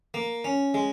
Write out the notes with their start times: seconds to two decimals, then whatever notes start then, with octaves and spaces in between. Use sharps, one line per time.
0.14 A#3
0.44 C#4
0.74 G#3